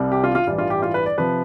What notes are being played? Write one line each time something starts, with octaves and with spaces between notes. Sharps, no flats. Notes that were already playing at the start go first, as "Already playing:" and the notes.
Already playing: C2 C3 G3
G4
F4
F4
A1 G2 E3 G3
F4
G4
F4
B4
D5
C3 F3 B4